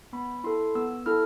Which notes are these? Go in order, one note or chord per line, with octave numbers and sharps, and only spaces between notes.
B3 B5
E4 A4 C6
B3 E6
E4 A4 F6